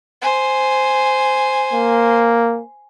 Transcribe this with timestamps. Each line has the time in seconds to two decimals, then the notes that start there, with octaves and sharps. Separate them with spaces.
0.21 C5 G#5
1.73 A#3